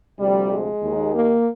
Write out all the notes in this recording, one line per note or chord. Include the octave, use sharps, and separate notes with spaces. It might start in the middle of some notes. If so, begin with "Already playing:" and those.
D2 C3 F3 G3
G#3
D#2 D#3
A#3